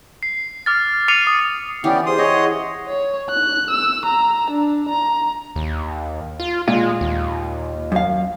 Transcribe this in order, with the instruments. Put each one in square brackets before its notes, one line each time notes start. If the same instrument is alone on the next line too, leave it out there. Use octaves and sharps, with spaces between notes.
[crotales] C7
D6 F6 A6
D6 F6 C7 C#7 D#7 F7
D#6
[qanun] E3 [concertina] B3 C#4 G4 [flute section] D5 G5
[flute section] G4 G#4 C5 [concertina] C6 D#6
[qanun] E4 [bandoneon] C#5 D#5
[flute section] G#4 F#5
[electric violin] C#5
F#6
E6
A#5
D4
A#5
[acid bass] D#2
F4
[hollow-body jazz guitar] A#2 F4 [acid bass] G#3
[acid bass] D#2
[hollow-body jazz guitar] F#2 F5